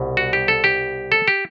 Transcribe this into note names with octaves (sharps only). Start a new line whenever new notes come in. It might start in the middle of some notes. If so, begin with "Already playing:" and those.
Already playing: C2 B2
F#4
G4
A4
G4
A4
G4